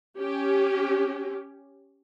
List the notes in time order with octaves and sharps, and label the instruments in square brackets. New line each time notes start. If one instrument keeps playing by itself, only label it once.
[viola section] C#4 G4